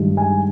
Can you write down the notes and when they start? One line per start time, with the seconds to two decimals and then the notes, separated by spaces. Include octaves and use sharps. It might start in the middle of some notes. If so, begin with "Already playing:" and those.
Already playing: G2 D#3 G#3
0.17 G#5